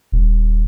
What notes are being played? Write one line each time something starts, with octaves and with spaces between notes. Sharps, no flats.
D#1